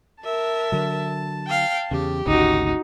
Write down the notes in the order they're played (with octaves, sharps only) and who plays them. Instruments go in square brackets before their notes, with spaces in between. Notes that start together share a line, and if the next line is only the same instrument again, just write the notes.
[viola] A#4 E5 [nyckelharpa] A5
[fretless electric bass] D3 F#3
[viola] F5 G5
[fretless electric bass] E2 C#3 [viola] G4
[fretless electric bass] G#1 D2 C#3 [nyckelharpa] D#4 F#4